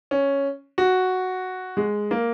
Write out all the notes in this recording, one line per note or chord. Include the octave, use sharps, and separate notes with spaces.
C#4
F#4
G#3
A#3